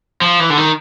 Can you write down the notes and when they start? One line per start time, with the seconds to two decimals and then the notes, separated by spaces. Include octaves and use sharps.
0.21 F3
0.40 E3
0.50 D3
0.58 D#3